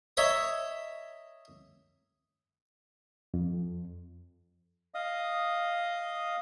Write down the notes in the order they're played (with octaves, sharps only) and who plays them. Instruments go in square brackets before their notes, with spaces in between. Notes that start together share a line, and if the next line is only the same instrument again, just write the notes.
[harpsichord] C#5 D#5 E5 A#5 D#6
[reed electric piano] F2
[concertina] D#5 F5 D#6